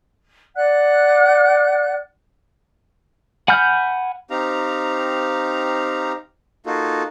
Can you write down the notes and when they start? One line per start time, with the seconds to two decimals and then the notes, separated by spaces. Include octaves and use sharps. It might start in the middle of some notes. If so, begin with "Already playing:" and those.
0.56 D5 F#5 F#6
3.48 F#5 G#5 B5 F6 G6
4.30 C4 D#4 G4 F5 A#5
6.66 A#3 D#4 F4 F#4 A4